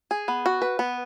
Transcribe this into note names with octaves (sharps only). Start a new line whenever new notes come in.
G#4
B3
F#4
B4
B3